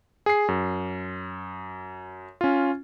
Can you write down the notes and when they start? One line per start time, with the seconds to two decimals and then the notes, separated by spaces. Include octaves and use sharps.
0.26 G#4 C7
0.48 F#2
2.41 C#4 F4